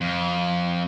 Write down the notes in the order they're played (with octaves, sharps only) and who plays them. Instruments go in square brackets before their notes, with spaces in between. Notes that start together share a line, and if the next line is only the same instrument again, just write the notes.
[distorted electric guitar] F2